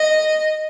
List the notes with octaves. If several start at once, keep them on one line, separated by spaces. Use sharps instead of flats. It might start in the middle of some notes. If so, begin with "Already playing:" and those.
Already playing: D#5